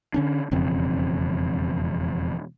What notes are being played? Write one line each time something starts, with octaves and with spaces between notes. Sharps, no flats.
D3 C#4 D4
E1 F2 C#3 C4